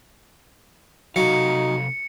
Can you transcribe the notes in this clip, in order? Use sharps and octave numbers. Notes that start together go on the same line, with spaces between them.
C3 F#3 D#4 A4 F5 C#7